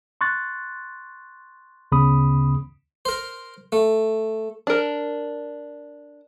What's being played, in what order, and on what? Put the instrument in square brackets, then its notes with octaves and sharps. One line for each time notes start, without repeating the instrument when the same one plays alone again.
[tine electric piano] C6 C#6 F#6 A6
D2 C#3 B3 B5 D#6
[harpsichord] A#4 C5
A3
[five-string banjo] D4 A#4